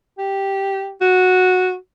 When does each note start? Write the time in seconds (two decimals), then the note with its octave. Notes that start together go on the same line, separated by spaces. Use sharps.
0.19 G4
1.01 F#4